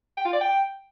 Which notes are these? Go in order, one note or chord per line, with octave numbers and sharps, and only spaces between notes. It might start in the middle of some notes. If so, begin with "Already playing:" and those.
G5
F4
D5
G5